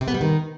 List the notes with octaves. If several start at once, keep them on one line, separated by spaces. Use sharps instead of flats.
C3
B3
G3
D#3